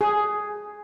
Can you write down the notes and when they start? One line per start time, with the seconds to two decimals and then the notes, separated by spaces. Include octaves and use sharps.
0.01 G#4